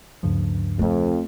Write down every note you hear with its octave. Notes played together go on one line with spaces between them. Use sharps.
D2 G2 C#3 F3
F2 A3 C4